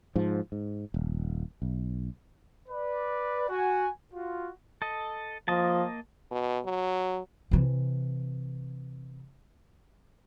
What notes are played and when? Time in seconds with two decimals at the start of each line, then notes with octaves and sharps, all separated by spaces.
0.16 G#2 F3
0.52 G#2
0.94 D#1
1.62 B1
2.69 B4 D5
3.49 F#4 G#5
4.14 F4 F#4
4.82 A4 D#5
5.48 F3 A#3 D#5 A5
6.32 B2
6.65 F#3
7.51 C3 E3